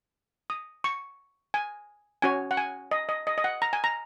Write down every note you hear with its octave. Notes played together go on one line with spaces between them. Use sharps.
D#6
C#6
G#5
C#4 F#4 C#5 G#5
F#5
G#5
D#5
D#5
D#5
D#5
F#5
A#5
G#5
A#5